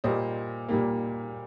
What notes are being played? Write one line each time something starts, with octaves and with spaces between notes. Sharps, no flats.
A#2 G3 A#3 C5 D#5
A#2 G3 A#3